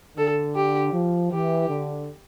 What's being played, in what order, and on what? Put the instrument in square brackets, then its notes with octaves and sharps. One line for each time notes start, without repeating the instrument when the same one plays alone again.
[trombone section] D3 [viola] A4
[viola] G4
[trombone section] F3
[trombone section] E3 [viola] G4
[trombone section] D3